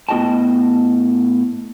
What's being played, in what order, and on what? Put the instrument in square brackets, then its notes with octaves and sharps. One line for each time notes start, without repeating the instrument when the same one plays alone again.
[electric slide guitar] A2 B3 F#4 D#5 G5 A5